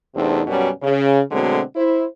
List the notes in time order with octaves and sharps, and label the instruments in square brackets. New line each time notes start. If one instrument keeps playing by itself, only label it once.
[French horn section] E2 C3 A3 C4 D4 D#4
F#2 B2 F#3 G3 C#4
C#3
B2 D3 F#3 G#3 A3 C4
E4 C5